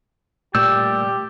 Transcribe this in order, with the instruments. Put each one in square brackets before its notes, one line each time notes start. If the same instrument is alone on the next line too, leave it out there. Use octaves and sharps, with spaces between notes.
[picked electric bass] A#2 A3 [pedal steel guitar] G3 D5 G6 [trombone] G4 [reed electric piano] E6